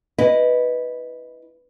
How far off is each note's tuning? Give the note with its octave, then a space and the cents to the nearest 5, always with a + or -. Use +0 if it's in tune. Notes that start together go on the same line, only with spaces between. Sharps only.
E4 -10 B4 +0 D#5 +0